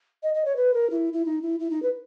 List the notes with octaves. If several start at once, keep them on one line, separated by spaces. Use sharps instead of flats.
D#5
D#5
C#5
B4
A#4
E4
E4
D#4
E4
E4
D#4
B4